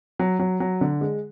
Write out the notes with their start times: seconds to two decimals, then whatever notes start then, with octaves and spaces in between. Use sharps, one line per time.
0.19 F#3
0.39 F#3
0.60 F#3
0.81 D3
1.01 G#3